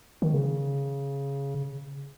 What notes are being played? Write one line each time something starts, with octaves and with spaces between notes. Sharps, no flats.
D#3
C#3